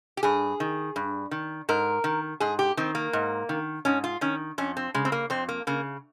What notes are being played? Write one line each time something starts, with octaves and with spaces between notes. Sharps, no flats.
G4
G2 G#4
D#3
G2
D#3
G#2 A#4
D#3
G#2 G#4
G4
D#3 C4
A#3
G#2
D#3
G#2 C#4
F4
D#3 C#4
F2 C#4
C4
C#3 G#3
C4
A#3
F2 C4
A#3
C#3 A#3